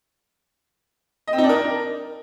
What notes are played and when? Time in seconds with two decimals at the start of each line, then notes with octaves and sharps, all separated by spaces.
1.27 D#5
1.33 C4
1.38 D#4
1.44 D4
1.49 A#4